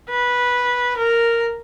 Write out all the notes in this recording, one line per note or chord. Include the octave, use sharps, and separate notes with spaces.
B4
A#4